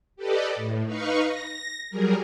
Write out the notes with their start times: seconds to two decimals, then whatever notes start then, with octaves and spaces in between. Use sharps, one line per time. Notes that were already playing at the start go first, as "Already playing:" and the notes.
0.16 G4 A4 B4 D5 D#5
0.55 A2
0.85 D#4 B4 F5 C#6
1.24 A#6
1.90 F#3 G3 G#4 A#4